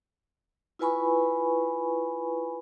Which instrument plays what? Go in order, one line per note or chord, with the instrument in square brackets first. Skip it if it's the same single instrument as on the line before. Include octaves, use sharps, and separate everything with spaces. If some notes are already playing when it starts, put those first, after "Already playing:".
[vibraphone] E4 F4 B4 G#5 B5 C#6